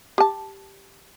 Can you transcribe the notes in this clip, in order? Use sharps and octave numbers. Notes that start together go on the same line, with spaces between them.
G4 A5